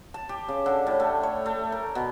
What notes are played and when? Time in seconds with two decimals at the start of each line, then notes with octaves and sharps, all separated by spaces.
0.14 A5
0.29 G4
0.48 C#3
0.66 D3
0.87 A2
1.00 A3
1.23 C#5
1.46 A3
1.72 A#4
1.95 B2